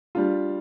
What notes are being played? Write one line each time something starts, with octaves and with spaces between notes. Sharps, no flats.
G3 D4 F4